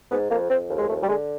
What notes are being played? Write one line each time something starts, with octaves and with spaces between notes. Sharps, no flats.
G#2 B3
F2 A#3
F2 C4
D#2
G#3
D#2 A3
G3
D3 G#3